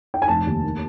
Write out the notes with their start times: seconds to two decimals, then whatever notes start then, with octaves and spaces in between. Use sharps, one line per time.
0.14 G5
0.22 G#5
0.28 F1 A5
0.47 D#2
0.64 A#3